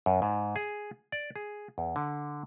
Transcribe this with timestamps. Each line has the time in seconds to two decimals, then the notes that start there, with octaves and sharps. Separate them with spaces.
0.06 F#2
0.22 G#2
0.56 G#4
1.12 D5
1.36 G#4
1.78 E2
1.96 D3